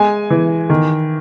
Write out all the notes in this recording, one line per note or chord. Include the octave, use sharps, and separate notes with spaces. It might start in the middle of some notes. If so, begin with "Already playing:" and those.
Already playing: G#3 G#5
E3
D#3